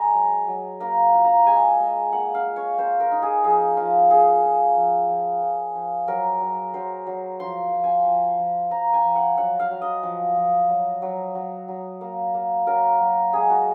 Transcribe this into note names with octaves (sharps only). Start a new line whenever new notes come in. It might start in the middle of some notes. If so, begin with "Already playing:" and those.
Already playing: G#3 G#5 A#5
F#3
F#3
A#3 A#5
F4
A#5
G#3 G#5
G#3
A#3 F#5
F5
F4
C#5
A#3 C5
A#4
D#4
G#4
F3 G#4
F3 F4
A#3 G#4
F4
F3
F3
F3
F3
F#3 A#4
F#3
F#3 C5
F#3
F3 C6
F3
G#5
F3
F3
F3 A#5
G#5
F3
F#5
F#3 F#5
F5
F#3
D#5
F3
F3
F#3
F#3
F#3
F#3
A#3
A#3
F#3 A#4
F#3
G#3 G#4
F#4